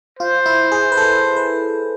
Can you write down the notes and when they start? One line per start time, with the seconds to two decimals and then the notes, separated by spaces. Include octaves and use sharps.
0.19 F4 C5
0.46 E4
0.72 G#4
0.92 B4
0.97 A4
1.37 B4